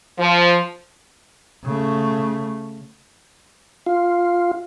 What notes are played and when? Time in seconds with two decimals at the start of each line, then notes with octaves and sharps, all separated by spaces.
0.18 F3
1.65 C#3 A3
3.86 F4